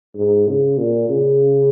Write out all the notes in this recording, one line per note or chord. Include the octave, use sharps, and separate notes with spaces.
G#2
C#3
A#2
C#3